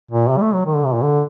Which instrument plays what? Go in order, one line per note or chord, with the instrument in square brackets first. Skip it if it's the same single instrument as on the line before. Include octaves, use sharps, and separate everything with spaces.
[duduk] A#2
C3
G3
A3
F#3
D#3
D3
C3
A#2
D3